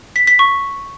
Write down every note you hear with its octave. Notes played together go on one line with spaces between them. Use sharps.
B6
B6
C#6